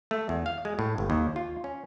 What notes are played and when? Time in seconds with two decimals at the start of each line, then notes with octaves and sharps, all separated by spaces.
0.11 A3
0.29 E2
0.46 F5
0.65 G#3
0.79 A2
0.98 G1
1.10 D#2
1.36 F4
1.64 C#4